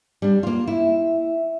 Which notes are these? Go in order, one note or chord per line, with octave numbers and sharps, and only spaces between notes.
G3 D4
A#3 F4
E4 E5